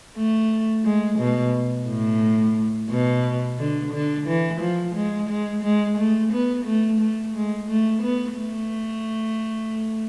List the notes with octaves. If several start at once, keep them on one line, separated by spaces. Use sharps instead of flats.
A3
G#3
B2
A2
B2
D3
D3
E3
F3
G#3
G#3
G#3
A3
B3
A3
A3
G#3
A3
B3
A3